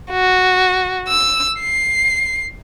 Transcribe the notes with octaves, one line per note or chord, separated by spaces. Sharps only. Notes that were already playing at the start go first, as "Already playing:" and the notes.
F#4
E6
C7